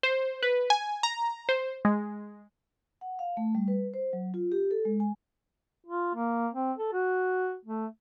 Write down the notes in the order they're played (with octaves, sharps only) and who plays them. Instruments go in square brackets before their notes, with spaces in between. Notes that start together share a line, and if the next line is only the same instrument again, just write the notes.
[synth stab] C5
B4
G#5
A#5
C5
G#3
[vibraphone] F#5
F5
A3
G3
B4
C5
F#3
F4
G4
A4
G#3
G#5
[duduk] F4
A#3
C4
A4
F#4
A3